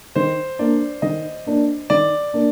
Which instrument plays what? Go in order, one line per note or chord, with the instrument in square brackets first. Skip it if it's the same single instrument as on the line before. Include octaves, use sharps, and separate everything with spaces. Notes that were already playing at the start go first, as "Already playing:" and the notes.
[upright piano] D#3 [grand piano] C5
[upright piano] A#3 D4 [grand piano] D5
[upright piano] D#3 [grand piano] D#5
[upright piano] A#3 D4
[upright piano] D#3 [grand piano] D5
[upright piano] A#3 D4